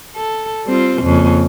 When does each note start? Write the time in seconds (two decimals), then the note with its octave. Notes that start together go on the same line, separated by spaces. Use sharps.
0.16 A4
0.66 G3 C4 F4
1.03 F2 C#3 A#3